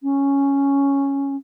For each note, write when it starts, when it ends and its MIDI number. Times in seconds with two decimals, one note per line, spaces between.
0.03 1.36 61